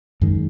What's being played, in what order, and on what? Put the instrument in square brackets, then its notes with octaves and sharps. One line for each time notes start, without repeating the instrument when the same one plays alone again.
[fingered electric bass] F#2 D#3 G#3